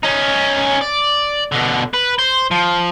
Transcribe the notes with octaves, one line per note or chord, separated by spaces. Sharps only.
C#4 D#4
D5
B2 D3
B4
C5
F3